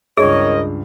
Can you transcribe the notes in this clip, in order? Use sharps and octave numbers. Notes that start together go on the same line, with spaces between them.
C#2 G2 D#3 G#4 A#4 C#5 D#5